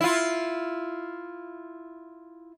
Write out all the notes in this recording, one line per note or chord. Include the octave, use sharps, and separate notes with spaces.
E4 F4